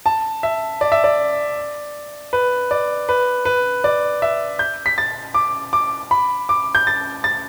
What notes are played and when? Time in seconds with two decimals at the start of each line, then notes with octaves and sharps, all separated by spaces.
0.06 A5
0.43 E5
0.81 D5
0.92 E5
1.04 D5
2.33 B4
2.71 D5
3.09 B4
3.45 B4
3.84 D5
4.22 E5
4.59 G6
4.86 B6
4.98 A6
5.34 D6
5.73 D6
6.11 B5
6.49 D6
6.75 G6
6.87 A6
7.24 A6